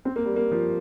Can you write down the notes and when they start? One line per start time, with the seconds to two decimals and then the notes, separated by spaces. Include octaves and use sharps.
0.05 C4
0.16 A#3
0.25 G3
0.36 A#3
0.51 F3